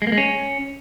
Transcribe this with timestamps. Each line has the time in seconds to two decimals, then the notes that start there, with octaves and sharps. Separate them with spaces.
0.02 G#3
0.07 A#3
0.12 G#3
0.18 C#4